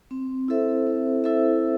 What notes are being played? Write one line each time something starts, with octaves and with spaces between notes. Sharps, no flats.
C4
E4 A4 C5 E5
C4
E4 A4 C5 E5